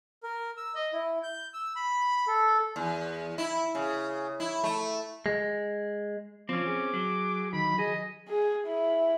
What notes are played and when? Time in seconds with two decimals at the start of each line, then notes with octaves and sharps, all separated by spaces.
0.23 A#4
0.57 E6
0.75 D#5
0.93 E4
1.23 G6
1.54 E6
1.76 B5
2.28 A4
2.76 E2
3.38 E4
3.75 C#3
4.40 E4
4.64 A3
5.26 G#3
6.49 F3 C4 C#4 D6
6.67 G#4
6.94 F#3
7.53 D#3 B5
7.78 G#4 D#5
8.29 G#4
8.67 E4